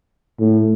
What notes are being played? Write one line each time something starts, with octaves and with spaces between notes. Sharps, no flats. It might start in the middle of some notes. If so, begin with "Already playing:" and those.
A2